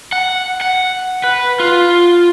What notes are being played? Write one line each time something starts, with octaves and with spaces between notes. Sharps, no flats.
F#5
F#5
B4
F4